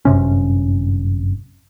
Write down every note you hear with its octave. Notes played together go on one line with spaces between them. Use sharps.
G1 F#2 C3 C#4